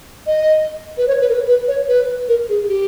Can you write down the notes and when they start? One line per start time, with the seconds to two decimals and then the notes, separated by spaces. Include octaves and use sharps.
0.27 D#5
0.98 B4
1.08 C#5
1.21 B4
1.29 A#4
1.34 B4
1.48 B4
1.68 C#5
1.88 B4
2.28 A#4
2.49 G#4
2.64 G#4
2.68 G4